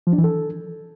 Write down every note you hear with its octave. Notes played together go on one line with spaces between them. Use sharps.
F3
D4
E3
A4